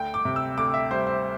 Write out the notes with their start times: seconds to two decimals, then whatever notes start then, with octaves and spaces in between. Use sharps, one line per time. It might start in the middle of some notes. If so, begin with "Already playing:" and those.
Already playing: D2 G5
0.14 D6
0.25 C3
0.36 E6
0.57 D2 D6
0.74 E5
0.90 G3 C5
1.07 C5